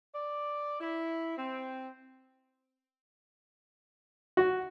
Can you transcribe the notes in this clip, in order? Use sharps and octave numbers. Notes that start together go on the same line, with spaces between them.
D5
E4
C4
F#4